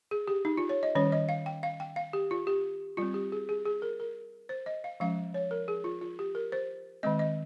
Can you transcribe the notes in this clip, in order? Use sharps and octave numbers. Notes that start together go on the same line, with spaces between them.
G#4
G4
D#4
F4
C#5
D#5
D#3 G3 C#4 C#5
D#5
F5
G5
F5
G5
F5
G4
F4
G4
G3 C4 F4
G4
G#4
G#4
G#4
A#4
A#4
C5
D#5
F5
F3 G#3 C#4 F5
C#5
A#4
G#4
F4
F4
G4
A#4
C5
D#3 G#3 C4 D#5
D#5